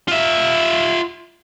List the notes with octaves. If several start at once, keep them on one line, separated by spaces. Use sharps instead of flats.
F4 E5